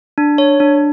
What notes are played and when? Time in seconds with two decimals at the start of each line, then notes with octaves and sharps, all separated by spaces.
0.18 D4
0.38 C#5
0.60 D4